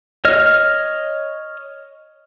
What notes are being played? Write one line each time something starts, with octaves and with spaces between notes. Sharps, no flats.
C#5 D#5 F6